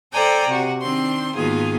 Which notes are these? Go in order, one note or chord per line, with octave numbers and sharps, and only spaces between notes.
A4 C5 D5 G5 G#5 A#5
C3 F#4
D#3 C4 D4 C6
G#2 B2 D#3 A#3 F4 G#4